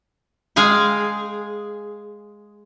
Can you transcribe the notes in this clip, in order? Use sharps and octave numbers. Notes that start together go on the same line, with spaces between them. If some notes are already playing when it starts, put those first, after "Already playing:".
G#3 G#4 F5 G5